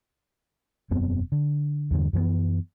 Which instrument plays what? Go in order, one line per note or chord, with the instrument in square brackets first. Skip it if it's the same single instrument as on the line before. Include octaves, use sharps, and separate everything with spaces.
[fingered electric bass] E1 F#2 B3 C4
D3
E2 G2 D3
F#2 E3 A3 B3